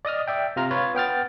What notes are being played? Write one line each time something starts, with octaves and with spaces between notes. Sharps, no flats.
D5 D#5 D#6 F6
D5 E5 G5
C3 F4 A#5 F6
F4 B4 C#5 B5
B3 G5 F6 A6